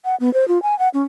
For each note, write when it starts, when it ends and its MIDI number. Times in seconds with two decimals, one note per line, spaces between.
0.05 0.16 78
0.20 0.32 59
0.34 0.47 72
0.48 0.61 65
0.63 0.77 80
0.79 0.89 78
0.94 1.02 61